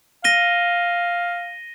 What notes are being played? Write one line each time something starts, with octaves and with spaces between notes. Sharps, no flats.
F5 A#6 D#7 G7